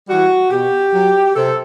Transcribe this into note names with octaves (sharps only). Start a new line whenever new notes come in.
E3 G3 F#4
B2 G4
F#3
C3 A4